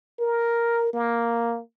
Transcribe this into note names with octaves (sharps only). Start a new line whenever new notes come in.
A#4
A#3